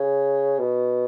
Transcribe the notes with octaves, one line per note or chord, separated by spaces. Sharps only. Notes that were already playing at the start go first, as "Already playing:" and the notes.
Already playing: C#3
B2